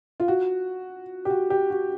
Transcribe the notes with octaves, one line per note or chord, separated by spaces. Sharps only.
F4
F#4
G4
F#4
G4
F#4